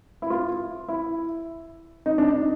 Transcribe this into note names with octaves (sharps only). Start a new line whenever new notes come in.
E4
F4
E4
D#4
D4
D#4